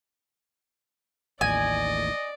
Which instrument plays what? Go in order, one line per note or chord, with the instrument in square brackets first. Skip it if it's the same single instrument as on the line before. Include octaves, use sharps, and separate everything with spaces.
[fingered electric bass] A1 D#2 A2 [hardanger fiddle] D5 [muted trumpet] D#5 [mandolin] G#5